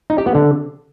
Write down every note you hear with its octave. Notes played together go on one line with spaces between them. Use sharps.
D#4
G4
B3
D3